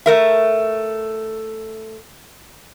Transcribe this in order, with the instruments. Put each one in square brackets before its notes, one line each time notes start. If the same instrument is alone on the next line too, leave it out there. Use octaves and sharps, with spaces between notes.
[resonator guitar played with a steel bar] A3 A#4 E5